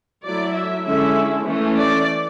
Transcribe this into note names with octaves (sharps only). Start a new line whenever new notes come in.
F#3 A3 E4 D5
E5
D3 G#3 C#4 E4 E5
E3 A3 C#4
D5